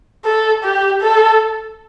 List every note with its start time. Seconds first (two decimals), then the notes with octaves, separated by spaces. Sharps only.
0.25 A4
0.64 G4
1.02 A4